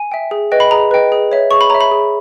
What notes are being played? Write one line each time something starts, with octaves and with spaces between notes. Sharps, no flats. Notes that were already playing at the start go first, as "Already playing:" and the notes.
Already playing: G#5
E5 G5
G#4
B4 D#5 G5
B5
G#4 A#5
B4 D#5 G5
G#4
C#5 E5
G#4 C#6
B5
C#5 E5 A#5
B5
G#4